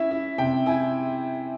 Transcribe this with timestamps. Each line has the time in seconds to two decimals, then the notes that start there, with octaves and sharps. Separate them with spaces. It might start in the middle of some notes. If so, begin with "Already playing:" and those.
Already playing: C#4 E4 E5
0.11 E4
0.38 C3 G5
0.66 E4 G#5